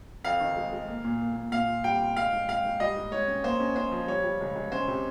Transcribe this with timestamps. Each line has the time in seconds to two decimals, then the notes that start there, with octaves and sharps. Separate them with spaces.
0.24 F2 F5
0.40 D#3
0.57 G#3
0.73 G#3
0.88 A#3
1.05 A#2
1.21 A#3
1.36 A#2
1.52 A#2 F5
1.68 F4
1.84 G3 G5
2.00 F4
2.17 G#3 F5
2.32 G#2
2.49 G#3 F5
2.65 G#2
2.80 G3 D#5
2.96 G#2
3.12 G#2 C#5
3.28 C#4
3.44 A#3 C5
3.60 C#4
3.76 C#4 C5
3.92 F3
4.08 G3 C#5
4.24 G3
4.41 C#2
4.55 C#2
4.72 C#4 C5
4.88 C3